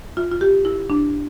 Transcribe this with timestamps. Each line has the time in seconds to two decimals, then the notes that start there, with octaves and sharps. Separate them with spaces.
0.17 F4
0.32 F4
0.41 G4
0.65 E4
0.90 D4